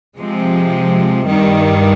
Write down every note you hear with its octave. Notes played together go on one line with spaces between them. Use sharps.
C3 F3 G#3 C4
G2 D#3 G3